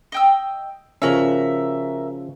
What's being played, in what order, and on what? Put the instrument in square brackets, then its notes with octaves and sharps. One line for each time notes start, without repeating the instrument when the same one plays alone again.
[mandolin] D#5 G5 E6
[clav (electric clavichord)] C#3 F3 C#4 [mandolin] F#4 A#4 E5